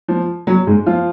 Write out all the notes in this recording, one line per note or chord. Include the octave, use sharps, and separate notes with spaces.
F3
F#3
G#2 G#3
F3 F4